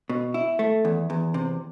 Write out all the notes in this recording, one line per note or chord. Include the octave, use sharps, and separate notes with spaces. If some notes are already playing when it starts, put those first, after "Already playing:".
B2
E4
A3
E2
E2
C3